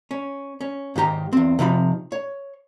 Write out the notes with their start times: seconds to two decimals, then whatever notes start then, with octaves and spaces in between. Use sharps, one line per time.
0.11 C#4
0.61 C#4
0.96 G#2 D#3 G4 A#5
1.33 E2 C4
1.59 C3 F3 D#4 B5
2.12 C#5